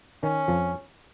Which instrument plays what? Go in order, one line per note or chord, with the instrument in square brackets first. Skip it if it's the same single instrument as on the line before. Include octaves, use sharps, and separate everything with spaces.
[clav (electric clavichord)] D#3 [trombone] C#4
[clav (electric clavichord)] F2 F3